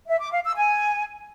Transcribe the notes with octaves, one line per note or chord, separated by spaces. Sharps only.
E5
D6
F5
E6
G#5